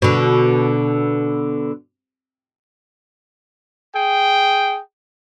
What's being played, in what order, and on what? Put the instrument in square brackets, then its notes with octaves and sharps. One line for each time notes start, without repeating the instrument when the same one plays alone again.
[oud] B2 D3
[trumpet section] G#4 G5